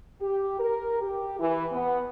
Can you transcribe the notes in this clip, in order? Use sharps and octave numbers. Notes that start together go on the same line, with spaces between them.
G4
A#4
G4
E3
B3